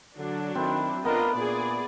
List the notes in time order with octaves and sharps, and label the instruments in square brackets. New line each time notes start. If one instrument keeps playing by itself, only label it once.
[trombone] D3 [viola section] F#3 D4
[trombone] D#3 [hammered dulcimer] C4 E4
[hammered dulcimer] B3 [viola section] D4 F4 D#5 [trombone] A#4
[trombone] A#2 [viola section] G#4 D5